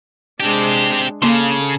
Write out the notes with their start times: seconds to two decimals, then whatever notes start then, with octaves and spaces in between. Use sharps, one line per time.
0.40 G#3 C4 D4 G4
1.22 C#3 A#3 A4 A5 C6